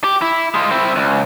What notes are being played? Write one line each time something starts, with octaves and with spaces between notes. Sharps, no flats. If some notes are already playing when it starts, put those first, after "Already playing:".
G4
E4
G#3 F4
C4 E4
C#2